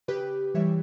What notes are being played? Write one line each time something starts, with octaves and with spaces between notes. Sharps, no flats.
C#3 G4 B4
E3 G3 C#5 E5